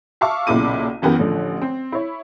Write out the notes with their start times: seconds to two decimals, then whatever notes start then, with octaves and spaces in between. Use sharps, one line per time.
0.21 E5 F5 A5 C#6 D6
0.47 B1 A#2 C#3 E4 D6 D#7
1.02 F#2 E3 B3 G4 A#4
1.19 A1 D3 F3
1.62 C4
1.92 E4 C#5